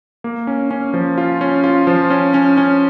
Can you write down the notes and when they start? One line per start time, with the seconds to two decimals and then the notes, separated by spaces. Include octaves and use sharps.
0.24 A#3
0.47 C#4
0.71 C#4
0.94 F3
1.18 F4
1.41 C#4
1.64 F4
1.87 F3
2.10 C#4
2.34 C#4
2.57 C#4